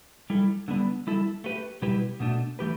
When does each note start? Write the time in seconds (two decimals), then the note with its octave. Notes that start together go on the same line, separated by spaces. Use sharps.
0.30 G3 E4 A4
0.68 D3 G3 B3 D4
1.07 G3 E4 A4
1.44 A3 G4 B4
1.82 B2 G3 E4 G4 B4
2.20 B2 A3 D4
2.59 E3 A3 G4 B4